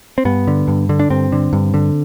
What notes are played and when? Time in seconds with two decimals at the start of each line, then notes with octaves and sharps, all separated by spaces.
0.18 C4
0.25 G2 B3
0.47 D3
0.68 G2
0.89 D3
1.00 D4
1.10 G2 C4
1.32 D3
1.53 G2
1.74 D3